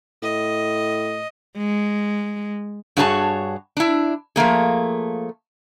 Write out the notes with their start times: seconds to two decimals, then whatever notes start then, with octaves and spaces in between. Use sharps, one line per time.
0.23 A2 D#5
1.57 G#3
2.97 G2 F#4 G#4 C#5 G#5 A5
3.77 D4 E4
4.36 F3 A3 A#3 G#4